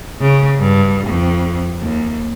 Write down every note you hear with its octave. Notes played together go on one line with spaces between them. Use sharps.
C#3
G2
F2
D#2